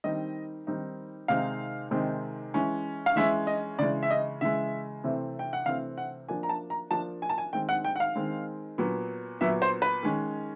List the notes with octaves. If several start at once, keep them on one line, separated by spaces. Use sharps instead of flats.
D#3 G3 C4 D#4 D#5
D#3 G3 C4 D#4
C3 D#3 G#3 C4 D#4 F5
C3 D#3 G#3 C4 D#4
E3 G#3 C#4
F5
E3 G#3 C#4 E5
D#5
C#3 E3 G#3 D5
E5
D#5
C#3 E3 G#3 E5
C3 E3 A3 C4
G5
F#5
C3 E3 A3 C4 F5
F#5
F3 A#3 D4 G#5
A#5
A5
A#5
F3 A#3 D4 A5
G#5
A5
G#5
D#3 G#3 C4 G5
F#5
G5
F#5
F5
D#3 G#3 C4
A#2 F#3 B3
A#2 F#3 B3 E5
C5
B4
D#3 G#3 C#4